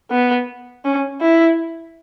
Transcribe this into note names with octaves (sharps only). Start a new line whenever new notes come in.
B3
C#4
E4